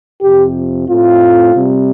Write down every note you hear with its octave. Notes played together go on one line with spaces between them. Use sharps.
F2 C3 F3 G4
A2 A3 C4 F4
C3 G3 C4